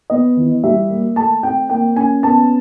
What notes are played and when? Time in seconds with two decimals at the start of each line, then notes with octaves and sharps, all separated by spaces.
0.10 B3 D#5
0.37 E3
0.63 G3 E5
0.90 A#3
1.16 A3 A5
1.43 C4 G5
1.69 A#3 G5
1.96 C#4 G#5
2.23 B3 A5